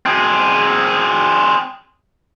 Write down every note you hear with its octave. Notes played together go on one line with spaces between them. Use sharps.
C4 G#4